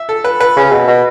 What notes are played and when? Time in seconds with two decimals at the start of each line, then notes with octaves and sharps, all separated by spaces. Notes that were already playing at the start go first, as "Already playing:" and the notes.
Already playing: E5
0.09 A4
0.24 B4
0.40 B4
0.56 C#3
0.72 B2
0.87 B2